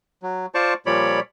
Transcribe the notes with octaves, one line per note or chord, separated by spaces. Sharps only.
F#3
F4 C5 D5 A5 C#6
A#2 F3 G3 C#5 D5 B5